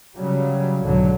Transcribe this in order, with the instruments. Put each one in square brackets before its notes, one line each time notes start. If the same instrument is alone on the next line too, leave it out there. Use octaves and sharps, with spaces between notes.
[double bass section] C#3 F#3 G3
B1 G#2 D3 F#3